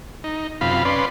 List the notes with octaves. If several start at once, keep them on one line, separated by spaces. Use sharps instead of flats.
D#4
F#2 C3 F4 F5 B5
C#4 B4 D5 C6